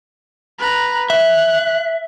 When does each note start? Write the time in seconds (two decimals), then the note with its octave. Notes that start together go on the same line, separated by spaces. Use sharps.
0.59 B4 A#5
1.10 E5 F#6